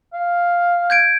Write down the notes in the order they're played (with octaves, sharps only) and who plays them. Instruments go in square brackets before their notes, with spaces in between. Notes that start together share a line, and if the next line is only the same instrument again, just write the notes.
[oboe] F5
[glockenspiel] G6 G#6 D7